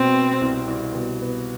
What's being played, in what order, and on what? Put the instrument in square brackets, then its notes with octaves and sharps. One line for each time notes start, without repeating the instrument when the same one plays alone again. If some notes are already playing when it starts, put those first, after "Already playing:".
Already playing: [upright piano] B2 [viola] C4
[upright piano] B3
C2
C2
B2
B3